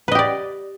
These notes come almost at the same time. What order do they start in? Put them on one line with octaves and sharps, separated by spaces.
B4 D#5 G4 D5